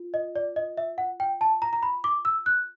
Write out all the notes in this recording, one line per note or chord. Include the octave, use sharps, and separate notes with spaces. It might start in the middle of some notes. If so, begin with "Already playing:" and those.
Already playing: F4
D#5
D5
D#5
E5
F#5
G5
A5
A#5
A#5
B5
D6
E6
F#6